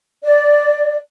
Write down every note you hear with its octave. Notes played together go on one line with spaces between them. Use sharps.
D5